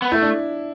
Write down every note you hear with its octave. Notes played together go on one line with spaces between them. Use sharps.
B3
A3 E4
D4